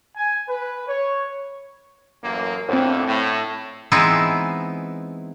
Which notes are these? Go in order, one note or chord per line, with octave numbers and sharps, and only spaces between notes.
G#5
B4
C#5
A1 F#2 A#3
F2 A2 D3 C4 C5
A2
E3 G#3 B3 C4 D#4 E4